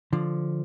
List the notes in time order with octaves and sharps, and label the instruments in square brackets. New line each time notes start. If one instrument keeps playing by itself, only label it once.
[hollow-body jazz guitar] D3 F3